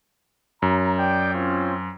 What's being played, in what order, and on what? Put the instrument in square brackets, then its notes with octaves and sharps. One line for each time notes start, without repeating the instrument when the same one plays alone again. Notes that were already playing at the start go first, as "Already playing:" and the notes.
[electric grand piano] F#2 [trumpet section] A#5
[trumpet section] D5 G5
C4 C#4 F4